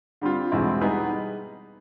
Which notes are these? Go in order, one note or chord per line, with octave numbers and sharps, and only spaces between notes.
D3 G3 C4 F4
E2 B2 G#3 C4 E4
G3 B3 D#4 G#4 B4